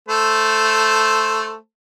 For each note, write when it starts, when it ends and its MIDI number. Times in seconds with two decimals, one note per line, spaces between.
0.08 1.56 57
0.08 1.56 69
0.08 1.56 72